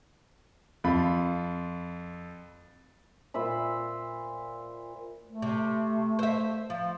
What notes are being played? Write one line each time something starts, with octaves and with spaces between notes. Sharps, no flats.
F2 F4 B5
A#2 C5 E5 B5
A3
C3
C5 E5
F3